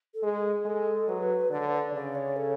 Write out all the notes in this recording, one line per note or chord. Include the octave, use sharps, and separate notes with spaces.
A4
G#3 G#4
G#3 A4
F#3 B4
D3 D5
D5
C#3 D5
C#5
A4